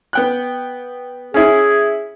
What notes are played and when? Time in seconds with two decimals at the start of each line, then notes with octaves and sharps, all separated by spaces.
0.13 B3 G5 F#6
1.34 C#4 E4 G#4